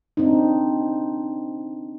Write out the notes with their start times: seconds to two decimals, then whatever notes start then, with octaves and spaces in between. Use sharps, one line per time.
0.17 C4 D4 D#4